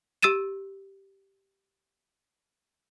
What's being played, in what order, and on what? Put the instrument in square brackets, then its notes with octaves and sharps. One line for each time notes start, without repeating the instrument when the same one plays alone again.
[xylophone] G4 E6 A6 D#7 E7